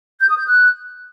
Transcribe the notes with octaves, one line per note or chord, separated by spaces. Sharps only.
G6
D#6
G6
F#6